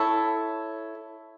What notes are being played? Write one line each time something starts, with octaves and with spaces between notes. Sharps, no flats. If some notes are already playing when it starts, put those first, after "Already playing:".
Already playing: E4 A4 C#5 A5